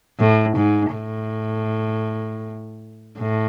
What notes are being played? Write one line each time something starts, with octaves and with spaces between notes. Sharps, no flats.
A2
G#2
A2
A2